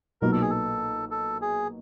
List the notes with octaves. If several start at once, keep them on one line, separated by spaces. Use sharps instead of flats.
B1 A#2 F#3 B3 D#4 A#4
A4
G#4
A4
A4
G#4